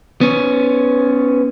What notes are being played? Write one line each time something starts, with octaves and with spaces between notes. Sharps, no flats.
B3 C#4